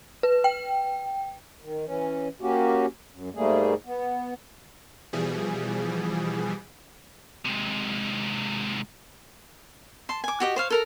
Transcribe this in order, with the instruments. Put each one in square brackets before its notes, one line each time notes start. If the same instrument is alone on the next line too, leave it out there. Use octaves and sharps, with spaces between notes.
[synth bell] B4
G5
[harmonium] D#3
E3 C#4
A#3 C#4 F#4 G4
F#2
G#2 G3 A3 A#3 G#4
B3
[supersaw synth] B2 E3 F3 G3 G#4
[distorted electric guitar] G#2 C3
[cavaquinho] A5 C6
G#5 D6
F#4 G4 D#5
C5 C#5 F5
A4 A#4 A#5